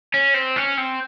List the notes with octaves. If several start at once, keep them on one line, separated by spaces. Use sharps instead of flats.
C#4
C4
C#4
C4